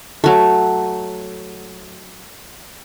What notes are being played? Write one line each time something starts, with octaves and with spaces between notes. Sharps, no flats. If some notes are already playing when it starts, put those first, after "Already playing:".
F#3 A3